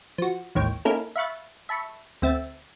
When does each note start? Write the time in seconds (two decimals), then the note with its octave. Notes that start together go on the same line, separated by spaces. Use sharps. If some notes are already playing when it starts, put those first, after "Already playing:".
0.18 F3 F#4
0.55 A1 D#2 G#2 C#5 G5 D7
0.85 A#3 C#4 D#4 E4 A4 A#4
1.16 E5 F5 B5 C#6 F#6 A6
1.69 E5 A5 B5 C#6
2.22 D2 C4 E5 A6